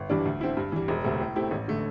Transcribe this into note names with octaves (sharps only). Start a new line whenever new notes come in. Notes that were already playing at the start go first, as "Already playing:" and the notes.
Already playing: G1
G2 E3 G3 D4
D2
D3 C4 E4
G2
E3 G3
E1
D2 C3 A3 C4
A2
A3 C4 E4 G4
A1
D3 A3